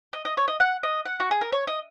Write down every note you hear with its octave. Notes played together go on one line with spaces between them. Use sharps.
D#5
D#5
C#5
D#5
F#5
D#5
F#5
F#4
G#4
A#4
C#5
D#5